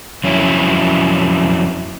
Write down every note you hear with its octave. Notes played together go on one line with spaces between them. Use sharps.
F2 F#3 C#4 E4